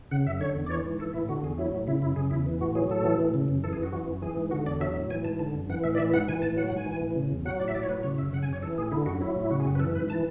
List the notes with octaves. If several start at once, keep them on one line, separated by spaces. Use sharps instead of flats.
C#3 F#5
F#2 E5
D3 C#5
E2
D5
E3 C#5
G#2
E3 A4
A2 E4
D3 F#4
E2 G#4
F#3 E4
A2
C#3 E4
F#2 E4
C#3 G#4
E2 E4
E3
A2 F#4
F#3 G#4
A2 A4
E3
A2
C#3
F#2
E3 A4
G#4
F#2 F#4
E3 F#4
F#2
E3 G#4
G#2
D3 F#4
E2 D5
F#3 E5
A2
E3 G#5
G#2 A5
D3 A5
F#2
E3 F#5
A2 E5
D5
E3 E5
G#2 F#5
E3 G#5
A2 A5
F#3 F#5
F#5
G#2 G#5
E3
A2
C#3
E2
F#3 F#5
A2 D5
E5
F#3 D5
C#5
A2 B4
C#3 C#5
F#2 E5
C#3 F#5
G#5
F#2
C#5
E3 A4
A2 G#4
D3 E4
F#2 F#4
F#3 E4
A2
E4
C#3 F#4
G#4
F#2 F#4
B4
E3 A4
G#2 B4
E3 A5